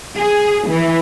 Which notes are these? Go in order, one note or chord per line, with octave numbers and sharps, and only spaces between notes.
G#4
E3